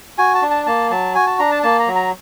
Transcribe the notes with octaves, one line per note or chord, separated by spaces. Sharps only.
F#4 G#5
A5
D4
A5
A#3 A5
F#3 A5
F#4 G#5
A5
D4 A#5
A5
A#3 A5
A#5
F#3
A#5